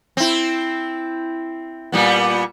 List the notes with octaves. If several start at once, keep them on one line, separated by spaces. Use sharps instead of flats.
C4 E4
A#2 G3 B3